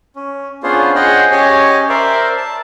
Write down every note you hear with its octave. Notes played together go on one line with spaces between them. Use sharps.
C#4
B3 C#4 D4 F4 G#4 C5
G#4 C5 C#5 D#5 F#5 G5
C#4 G4 C#5 D#5 G#5
A#4 C5 D5 E5
A5